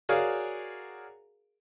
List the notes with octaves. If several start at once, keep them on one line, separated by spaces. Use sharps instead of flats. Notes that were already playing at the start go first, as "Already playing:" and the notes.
F#4 G#4 A#4 C#5 D5 F5